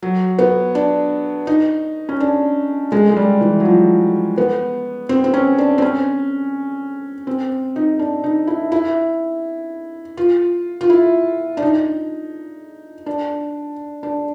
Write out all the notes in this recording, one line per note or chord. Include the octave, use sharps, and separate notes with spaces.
F#3
B3
D4
D#4
C#4
D4
G#3
G#3
G3
E3
F#3
F3
B3
C4
C4
C#4
D4
C4
C#4
C4
D#4
D4
D#4
E4
E4
F4
F4
E4
D4
D#4
D4
D4